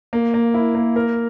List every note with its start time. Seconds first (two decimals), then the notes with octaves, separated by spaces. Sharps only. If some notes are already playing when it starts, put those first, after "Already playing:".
0.13 A#3
0.34 A#3
0.54 E4
0.75 A#3
0.96 A#4